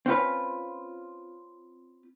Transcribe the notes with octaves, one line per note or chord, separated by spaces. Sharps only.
C4 C#4 F4 B4